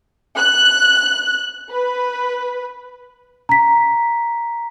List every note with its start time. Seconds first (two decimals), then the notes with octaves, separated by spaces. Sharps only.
0.38 F#6
1.71 B4
3.49 A#5 B6